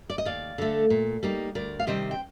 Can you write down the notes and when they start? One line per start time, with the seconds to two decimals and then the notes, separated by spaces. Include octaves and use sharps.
0.10 D5
0.18 D#5
0.25 D#2 D5 F5
0.58 D3 A3
0.90 A#2
1.23 G3 A#3 D#4
1.55 D2 A#4 D5
1.79 F5
1.87 C3 D#3 G3 C4 C5 D#5
2.11 G5